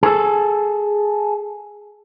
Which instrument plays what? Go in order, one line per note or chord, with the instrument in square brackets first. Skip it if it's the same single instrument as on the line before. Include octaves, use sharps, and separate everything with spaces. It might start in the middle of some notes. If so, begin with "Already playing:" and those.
[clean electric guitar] G#4 A4